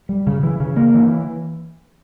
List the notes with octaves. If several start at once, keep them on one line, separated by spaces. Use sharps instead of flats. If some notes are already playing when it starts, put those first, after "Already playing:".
G3
C#3
E3
C#3
A#3
E3